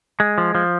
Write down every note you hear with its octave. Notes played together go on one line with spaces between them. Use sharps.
G#3
F3
F3